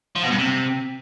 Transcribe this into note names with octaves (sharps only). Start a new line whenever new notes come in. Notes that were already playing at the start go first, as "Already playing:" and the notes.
F3
B2
G2
C3